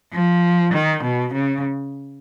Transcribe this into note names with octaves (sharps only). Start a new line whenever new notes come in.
F3
D#3
B2
C#3